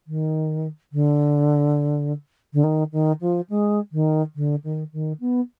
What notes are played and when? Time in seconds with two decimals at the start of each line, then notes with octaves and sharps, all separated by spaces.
0.07 D#3
0.92 D3
2.53 D3
2.64 D#3
2.92 D#3
3.21 F3
3.50 G#3
3.92 D#3
4.36 D3
4.64 D#3
4.93 D#3
5.20 B3